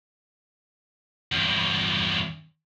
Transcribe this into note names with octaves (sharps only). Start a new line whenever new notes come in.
E2 G2